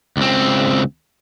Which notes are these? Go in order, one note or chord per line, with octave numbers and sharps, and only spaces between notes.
C#2 C4